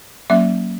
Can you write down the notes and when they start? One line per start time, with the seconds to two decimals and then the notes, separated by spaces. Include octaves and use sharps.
0.30 F#3 A#3 C#4 E5